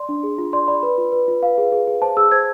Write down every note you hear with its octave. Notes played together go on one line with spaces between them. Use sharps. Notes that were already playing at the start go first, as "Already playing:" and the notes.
Already playing: D5 C6
D4
G#4
F4
D5 C6
D5 B5
B4
F4
B4
F4
B4 F5
G#4
G#4
G#4
C5 A5
G#4 E6
C5 G#6